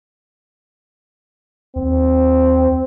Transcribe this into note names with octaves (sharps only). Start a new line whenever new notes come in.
D#2 C4